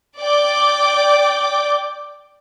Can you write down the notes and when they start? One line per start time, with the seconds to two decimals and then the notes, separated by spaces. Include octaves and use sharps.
0.18 D5 G5 D6